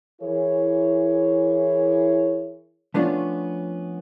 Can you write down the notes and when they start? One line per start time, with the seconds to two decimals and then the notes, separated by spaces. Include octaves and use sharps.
0.22 E3 E4 G#4 A#4 C#5
2.94 F3 A3 B3 C#4 D4 F4